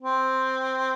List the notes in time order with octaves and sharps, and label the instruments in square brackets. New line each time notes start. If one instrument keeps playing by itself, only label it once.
[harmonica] C4